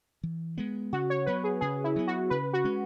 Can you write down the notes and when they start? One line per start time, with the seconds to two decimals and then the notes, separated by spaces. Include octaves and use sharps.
0.23 E3
0.58 G#3 B3
0.93 C#3 F#4
1.10 C#5
1.26 F#3 B3 B4
1.44 G#4
1.61 C#3 G#4
1.84 E4
1.96 F#3 B3
2.07 F#4
2.30 C#3 B4
2.53 F#4
2.64 G#3 C#4